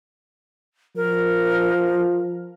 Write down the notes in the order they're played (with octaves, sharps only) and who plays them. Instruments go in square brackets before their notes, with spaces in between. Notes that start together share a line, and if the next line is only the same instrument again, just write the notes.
[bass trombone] F3 [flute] A#4